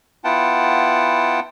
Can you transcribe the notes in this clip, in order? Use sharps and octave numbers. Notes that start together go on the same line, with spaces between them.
B3 E4 F4 F#5 G5 A5